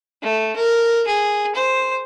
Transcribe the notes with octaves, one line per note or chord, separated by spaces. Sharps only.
A3
A#4
G#4
C5